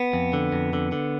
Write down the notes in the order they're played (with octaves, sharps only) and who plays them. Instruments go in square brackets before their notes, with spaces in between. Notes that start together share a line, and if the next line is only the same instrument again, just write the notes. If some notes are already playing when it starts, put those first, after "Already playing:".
Already playing: [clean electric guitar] B3
F2
D3
F2
D3
D3